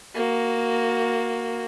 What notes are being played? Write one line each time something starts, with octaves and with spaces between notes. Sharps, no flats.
A#3 F#4